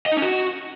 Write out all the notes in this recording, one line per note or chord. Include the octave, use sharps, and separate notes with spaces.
D#5
D#4
C#4
F#4